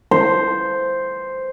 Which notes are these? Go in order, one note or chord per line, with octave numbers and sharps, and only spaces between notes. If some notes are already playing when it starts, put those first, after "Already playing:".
C5